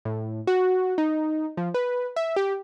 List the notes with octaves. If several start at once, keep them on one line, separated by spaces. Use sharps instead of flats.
A2
F#4
D#4
F3
B4
E5
G4